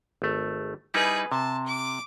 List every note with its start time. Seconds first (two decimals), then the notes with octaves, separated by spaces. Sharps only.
0.22 G#1 A3
0.94 G3 D#4 E4 G#4 B4
1.32 C3 A5
1.66 D6